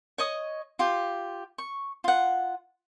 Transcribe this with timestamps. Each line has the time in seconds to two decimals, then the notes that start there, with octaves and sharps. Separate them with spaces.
0.18 C#5 D#5 D#6
0.79 F4 G4
1.58 C#6
2.04 F4 F#5